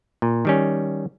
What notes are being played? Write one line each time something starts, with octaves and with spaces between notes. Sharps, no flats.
A#2
D#3 G3 C#4